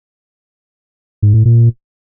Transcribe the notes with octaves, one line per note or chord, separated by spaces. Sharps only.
G#2
A2
A#2